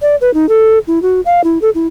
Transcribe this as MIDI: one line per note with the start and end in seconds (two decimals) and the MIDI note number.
0.02 0.16 74
0.21 0.33 71
0.34 0.48 63
0.49 0.79 69
0.87 1.01 64
1.02 1.21 66
1.25 1.43 77
1.44 1.58 64
1.62 1.70 69
1.75 1.87 64